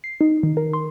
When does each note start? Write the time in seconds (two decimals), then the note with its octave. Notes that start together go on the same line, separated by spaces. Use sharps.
0.04 C7
0.21 D#4
0.43 D#3
0.57 A#4
0.73 C6